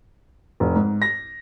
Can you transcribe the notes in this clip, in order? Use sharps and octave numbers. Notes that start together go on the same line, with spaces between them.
F1
G#2
A#6